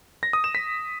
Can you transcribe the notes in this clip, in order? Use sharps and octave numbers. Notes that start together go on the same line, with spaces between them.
A#6
D#6
E7
B6